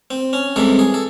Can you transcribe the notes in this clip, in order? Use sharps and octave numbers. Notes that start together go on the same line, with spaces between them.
C4
C#4
C2 C3 E3 G#3 A4
G#4
A4